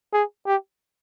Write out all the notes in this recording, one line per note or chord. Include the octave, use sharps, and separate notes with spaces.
G#4
G4